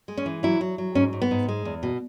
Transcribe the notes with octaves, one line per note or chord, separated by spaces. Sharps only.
G#3
C#4
E3
F#3 E4
F#3
F#3
G#2 C#4
G#2
B3
G#2
G#3
E2
B2